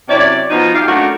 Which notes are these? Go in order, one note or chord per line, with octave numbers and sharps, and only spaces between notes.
F#2 C3 E4 C#5 D5
B2 F3 D#4
G4 F5
F#2 A3 A#3 D4 D#4 F#4